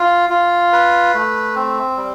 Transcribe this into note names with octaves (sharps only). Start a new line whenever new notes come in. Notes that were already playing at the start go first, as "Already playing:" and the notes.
Already playing: F4
F4
B4
A3
C4
G3